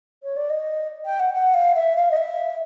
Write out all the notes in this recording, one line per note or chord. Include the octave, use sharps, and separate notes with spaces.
C#5
D5
D#5
G5
F#5
F#5
F5
E5
F5
D#5
E5